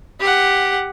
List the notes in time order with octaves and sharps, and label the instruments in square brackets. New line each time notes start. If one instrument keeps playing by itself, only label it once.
[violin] G4 F#5